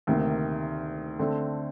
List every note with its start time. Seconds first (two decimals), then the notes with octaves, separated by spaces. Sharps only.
0.07 D2 C3 D#3 A#3
1.19 D3 A3 C4